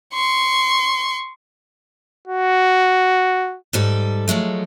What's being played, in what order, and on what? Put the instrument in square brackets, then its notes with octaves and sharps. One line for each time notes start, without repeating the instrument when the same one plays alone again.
[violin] C6 C#6
[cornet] F#4
[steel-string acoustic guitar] G#2 G3 A4
F3 F#3 G#3 A3